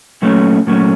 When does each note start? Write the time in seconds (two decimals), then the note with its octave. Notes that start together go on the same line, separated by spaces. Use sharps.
0.22 A#2 F#3 A3 C#4
0.67 A#2 F#3 A3 C#4